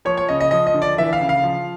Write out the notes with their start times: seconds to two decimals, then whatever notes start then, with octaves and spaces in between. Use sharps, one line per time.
0.05 F3 C#5
0.17 C#5
0.29 C#3 D#5
0.40 D#5
0.51 F3 D#5
0.67 D#5
0.74 D3
0.82 D5
0.98 E3 E5
1.13 F5
1.21 C#3
1.29 F5
1.43 F3